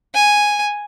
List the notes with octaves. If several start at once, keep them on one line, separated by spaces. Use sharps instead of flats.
G#5